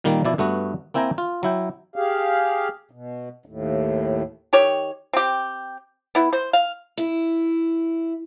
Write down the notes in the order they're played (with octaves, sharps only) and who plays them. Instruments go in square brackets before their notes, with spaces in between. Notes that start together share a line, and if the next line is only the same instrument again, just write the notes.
[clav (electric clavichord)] A#2 D#3 G3 A#3
B2 F3 E4 D5
G2 A3 B3 F#4
A#3 C4 E4 G5 G#5 A#5
F4
F#3 E4 G5
[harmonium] G4 G#4 F5
B2
D#2 A2
[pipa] D#3 G4 C#5
C4 G4
B3 E4
C5
F5
[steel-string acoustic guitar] E4